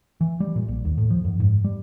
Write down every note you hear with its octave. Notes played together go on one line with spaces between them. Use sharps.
E3
G3
A#2
A#1
D#2
A2
F3
F#2
G#2
G3